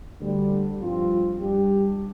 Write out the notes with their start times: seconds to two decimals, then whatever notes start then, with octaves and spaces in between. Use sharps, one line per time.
0.19 D2 D3 G3
0.78 G2 F3 C4 F4
1.39 G2 G3 D4 G4